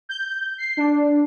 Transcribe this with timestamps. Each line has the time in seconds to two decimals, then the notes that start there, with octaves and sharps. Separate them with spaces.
0.09 G6
0.58 C7
0.77 D4